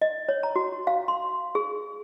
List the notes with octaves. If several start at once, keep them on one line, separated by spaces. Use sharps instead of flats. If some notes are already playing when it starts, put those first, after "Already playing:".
D#5
C#5
A#5
F#4
F5
C6
G#4